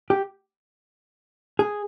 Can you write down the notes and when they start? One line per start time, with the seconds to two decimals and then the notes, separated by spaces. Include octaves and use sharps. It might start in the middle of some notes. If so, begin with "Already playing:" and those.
0.10 G4
1.59 G#4